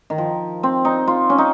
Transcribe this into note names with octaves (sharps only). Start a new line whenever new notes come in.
D#3
F3
C4
D#4
F4
C#4
D#4